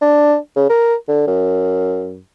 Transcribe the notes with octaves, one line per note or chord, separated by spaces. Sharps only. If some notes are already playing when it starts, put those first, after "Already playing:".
D4
C#3
A#4
D3
F#2